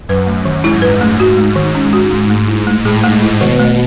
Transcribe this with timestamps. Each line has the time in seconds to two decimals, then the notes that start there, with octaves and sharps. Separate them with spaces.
0.09 F#2 B4
0.27 A3
0.45 D#3
0.64 G#2 E4
0.82 B4
1.01 A3
1.20 F#4
1.37 G#3
1.56 D#3
1.75 C#4
1.93 F#4
2.11 G#3
2.30 G#2 A3
2.48 E4
2.67 A3
2.85 A2 G#4
3.03 A3
3.22 E4
3.40 B2 D#3
3.60 A3